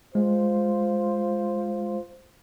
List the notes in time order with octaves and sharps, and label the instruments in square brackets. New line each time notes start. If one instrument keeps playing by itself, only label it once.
[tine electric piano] G#3 [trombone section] F4 C5